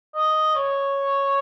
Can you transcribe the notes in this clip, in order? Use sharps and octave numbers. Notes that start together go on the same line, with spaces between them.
D#5
C#5